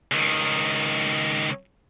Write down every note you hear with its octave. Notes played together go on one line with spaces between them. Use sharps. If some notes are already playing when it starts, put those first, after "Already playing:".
C#2 D#3